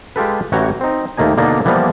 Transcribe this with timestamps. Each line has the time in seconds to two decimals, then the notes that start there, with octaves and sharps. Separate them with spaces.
0.16 G#3 F4 G4 A4 B4
0.52 A1 E3 F#4 C#5 G5 A#5
0.81 C4 D#4
1.17 D#2 A3 A#3 D#4 G#5
1.37 B2 D3 A#3 D4 D#4
1.65 E3 F3 G3 A#3 B3